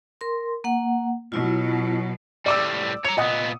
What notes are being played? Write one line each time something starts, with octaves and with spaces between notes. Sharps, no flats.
A#4 C6
A#3 F#5
B2 F#3 E4 F4
A2 G3 D5 D6 E6
C#5 A#5 C#7
A#2 B3 D#5 F#5 D#6